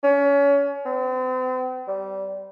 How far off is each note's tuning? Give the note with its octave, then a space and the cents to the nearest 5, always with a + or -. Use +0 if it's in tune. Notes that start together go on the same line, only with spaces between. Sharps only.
C#4 +30
C4 -40
G3 -20